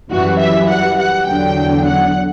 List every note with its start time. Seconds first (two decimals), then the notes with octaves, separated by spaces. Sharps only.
0.10 F#2 E3 G3 F#4
0.39 E5
0.68 F#5
0.98 F#5
1.27 E2 D3 F#3 G5
1.85 F#5